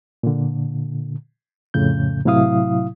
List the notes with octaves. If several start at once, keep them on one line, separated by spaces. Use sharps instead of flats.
A#2 D3
F2 A2 C#3 G6
A2 C3 F#3 E4 F5 D#6